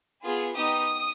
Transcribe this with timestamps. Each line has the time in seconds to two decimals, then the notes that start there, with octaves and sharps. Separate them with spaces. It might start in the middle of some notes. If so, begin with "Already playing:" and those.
0.24 B3 F4 G#4
0.56 B3 D#4 G4 D#6